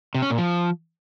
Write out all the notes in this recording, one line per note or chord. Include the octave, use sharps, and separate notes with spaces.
C3
C#4
A#2
F3